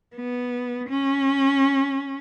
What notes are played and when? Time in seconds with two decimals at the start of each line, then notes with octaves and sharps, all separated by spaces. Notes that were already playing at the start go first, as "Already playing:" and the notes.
0.16 B3
0.88 C#4